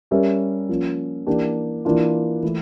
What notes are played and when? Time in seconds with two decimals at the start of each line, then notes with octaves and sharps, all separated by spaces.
0.11 G3 C#4 G4 A#4 E5
0.69 F3 A#3 C#4
1.27 E3 A#3 D4 G4
1.85 E3 A#3 D4 F4
2.43 E3 A3 E4